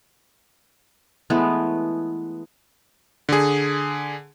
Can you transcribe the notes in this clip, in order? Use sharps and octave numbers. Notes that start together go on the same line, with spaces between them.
E3 G#3 A3 B3
D3 G#4